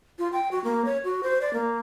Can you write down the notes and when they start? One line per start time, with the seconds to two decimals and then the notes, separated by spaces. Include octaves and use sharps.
0.19 F4
0.33 G5
0.52 F#4
0.64 A#3
0.85 C#5
1.04 F#4
1.23 C5
1.41 D5
1.54 A#3